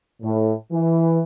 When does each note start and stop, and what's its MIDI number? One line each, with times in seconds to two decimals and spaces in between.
0.22 0.54 45
0.72 1.22 52